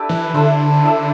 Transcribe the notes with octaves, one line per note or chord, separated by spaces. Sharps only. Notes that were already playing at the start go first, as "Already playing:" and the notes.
Already playing: D4 E4 G4 A4 B4 D5
E3
D3 E4 A4 C5
E4 A4 E5